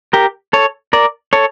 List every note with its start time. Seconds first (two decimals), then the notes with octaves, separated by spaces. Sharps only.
0.13 G4 A#4
0.53 A4 C#5
0.93 A#4 D5
1.33 A4 C#5